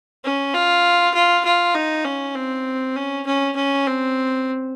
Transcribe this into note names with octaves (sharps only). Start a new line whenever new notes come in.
C#4
F4
F4
F4
D#4
C#4
C4
C#4
C#4
C#4
C4